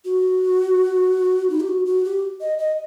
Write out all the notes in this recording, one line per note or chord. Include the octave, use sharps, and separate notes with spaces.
F#4
D#4
G4
F#4
F#4
G4
D#5
D#5